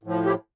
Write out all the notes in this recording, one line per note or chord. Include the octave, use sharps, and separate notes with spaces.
A2 F3
E4 G4